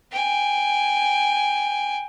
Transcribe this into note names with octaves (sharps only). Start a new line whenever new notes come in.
G5 G#5